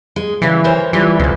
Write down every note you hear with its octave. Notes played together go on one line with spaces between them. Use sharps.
G#3
F#2 C#3 E3 G3
A#4 C5 C#5
E3 G3 F4 G4
C#2 C3 A4